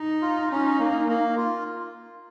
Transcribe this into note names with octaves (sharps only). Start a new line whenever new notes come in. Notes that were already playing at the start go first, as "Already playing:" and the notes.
Already playing: D#4
F4
C#4 D#4
A#3
A#3
F4